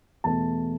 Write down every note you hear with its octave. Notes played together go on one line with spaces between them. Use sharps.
E2 B2 A3 A5